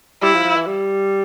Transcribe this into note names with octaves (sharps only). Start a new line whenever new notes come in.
G3 E4
F3
F3
E3
G3